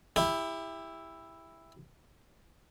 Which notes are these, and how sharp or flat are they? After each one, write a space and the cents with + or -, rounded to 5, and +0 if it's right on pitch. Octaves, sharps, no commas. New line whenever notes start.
E4 +0 G4 +30